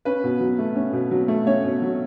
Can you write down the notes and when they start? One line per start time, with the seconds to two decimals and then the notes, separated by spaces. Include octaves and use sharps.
0.05 C#4 B4
0.24 B2
0.40 F#3
0.58 A3
0.76 C#4
0.93 B2
1.11 F#3
1.28 A3
1.47 C#4 C#5
1.64 B2
1.82 F#3